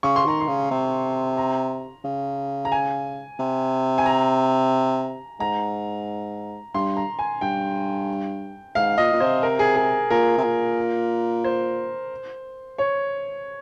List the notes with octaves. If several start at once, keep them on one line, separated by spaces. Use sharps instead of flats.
C#3 C#6
C6
D#3 A#5
C6
C#3
C3
A#5
C#3
A#5
G#5
C3
G#5
A#5
G#2 A#5
G2 C6
A#5
G#5
G2 G5
G#2 F5
A#2 D#5
A#2
C3 C5
A#4
G#4
G#4
A#2 A#4
C3
A#2
C5
C#5